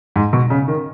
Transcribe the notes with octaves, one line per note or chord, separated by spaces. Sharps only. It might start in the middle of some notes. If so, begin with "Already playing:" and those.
G#2
B2
C#3
D#3